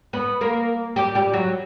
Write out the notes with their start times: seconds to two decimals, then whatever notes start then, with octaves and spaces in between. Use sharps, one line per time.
0.13 B3 B4
0.41 A#3 A#4
0.96 G3 G4
1.15 G3 G4
1.33 F#3 F#4